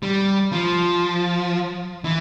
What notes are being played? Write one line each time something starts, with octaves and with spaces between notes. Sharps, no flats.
G3
F3
E3